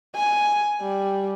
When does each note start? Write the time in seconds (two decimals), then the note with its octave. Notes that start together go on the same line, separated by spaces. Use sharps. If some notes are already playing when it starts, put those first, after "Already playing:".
0.15 G#5
0.82 G3